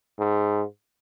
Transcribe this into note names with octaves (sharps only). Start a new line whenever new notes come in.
G#2